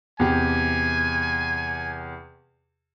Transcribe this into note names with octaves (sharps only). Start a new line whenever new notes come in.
E2 C3 G4 G#5